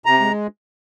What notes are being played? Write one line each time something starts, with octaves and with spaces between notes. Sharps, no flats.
C3 A#5
G#3